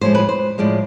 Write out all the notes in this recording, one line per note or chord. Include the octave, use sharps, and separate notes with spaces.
A2 F3 G#3 C5
B4
C5
A2 F3 G#3 D5